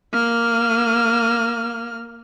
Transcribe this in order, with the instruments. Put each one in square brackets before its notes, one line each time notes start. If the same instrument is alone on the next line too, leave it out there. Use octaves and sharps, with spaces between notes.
[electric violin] A#3 F6